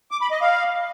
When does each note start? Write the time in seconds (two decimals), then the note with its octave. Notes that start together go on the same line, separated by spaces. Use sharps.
0.11 D6
0.21 B5
0.31 D#5
0.41 F5